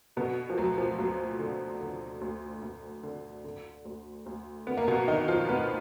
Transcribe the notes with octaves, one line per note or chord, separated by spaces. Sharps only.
B2 D3 B3
F3
D2 F#3
F3
D2 F#3
D3
D3
D2
D2
D3
D3
D2
D2
D3 B3
A#3
B2 B3
D3 D#3 D#4
F3 F4
D2 B3 B4